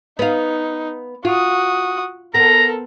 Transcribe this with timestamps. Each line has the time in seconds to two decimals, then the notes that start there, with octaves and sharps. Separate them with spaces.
0.19 B3 D#4 F5
1.25 F4 F#4 D#6
2.34 B3 C4 A4 A#4 A#5